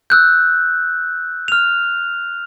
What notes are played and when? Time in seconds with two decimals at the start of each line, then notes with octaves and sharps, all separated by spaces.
0.10 E6 F#6 G6
1.48 F6 F7